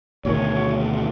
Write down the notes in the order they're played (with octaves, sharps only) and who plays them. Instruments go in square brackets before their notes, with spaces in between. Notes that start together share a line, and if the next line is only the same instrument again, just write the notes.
[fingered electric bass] D2 B2 D#3 [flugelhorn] C#5